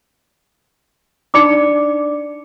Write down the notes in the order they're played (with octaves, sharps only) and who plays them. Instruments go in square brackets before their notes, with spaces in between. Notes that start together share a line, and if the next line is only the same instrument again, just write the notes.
[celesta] D4 D5 C#7 [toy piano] D#4 B5 D6